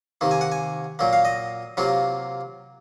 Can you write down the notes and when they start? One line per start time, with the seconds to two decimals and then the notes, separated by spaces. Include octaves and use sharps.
0.21 C3 D#3 A#3
0.31 G#5
0.41 F#5
0.52 G#5
0.99 A#2 F#3 A#3
1.13 F5
1.25 D#5
1.77 C3 F#3 A#3 F4